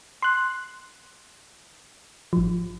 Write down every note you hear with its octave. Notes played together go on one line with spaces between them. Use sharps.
C6 F#6
G#1 F3